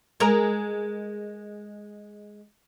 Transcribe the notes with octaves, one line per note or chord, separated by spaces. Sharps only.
G#3 A#4